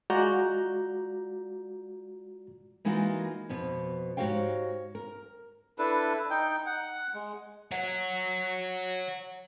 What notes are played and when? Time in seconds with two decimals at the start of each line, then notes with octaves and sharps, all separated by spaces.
0.10 G#3 F4 F#4 D5 A#5 G6
2.85 E3 G#3 A#3 D#4 F4 F#4
3.49 F2 B2 B3
4.17 G#2 F#4 G4 C#5 F5 G5
4.95 A#4
5.79 D4 E4 A4 B4
6.30 D#4 G5
6.66 F#5
7.14 G#3
7.71 C#5 F#5